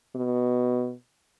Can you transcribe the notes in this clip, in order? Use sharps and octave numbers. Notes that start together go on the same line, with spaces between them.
B2